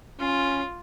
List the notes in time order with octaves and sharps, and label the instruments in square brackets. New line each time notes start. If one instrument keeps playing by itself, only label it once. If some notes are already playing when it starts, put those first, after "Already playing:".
[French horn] C#4 [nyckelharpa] F4